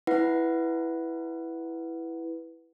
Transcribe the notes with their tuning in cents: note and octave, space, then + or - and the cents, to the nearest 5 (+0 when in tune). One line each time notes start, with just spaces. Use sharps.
E4 +0 B4 +0 F#5 +0